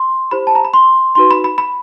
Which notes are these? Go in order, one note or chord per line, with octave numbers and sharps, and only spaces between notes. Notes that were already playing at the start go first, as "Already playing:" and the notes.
Already playing: C6
E4 G4 C5 B5
A5
A#5
B5
C6
D#4 F#4 B4 C6
B5
B5
B5